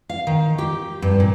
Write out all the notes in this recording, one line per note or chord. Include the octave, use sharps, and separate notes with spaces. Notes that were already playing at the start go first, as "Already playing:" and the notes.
F5
D#3
G4
G2
A#2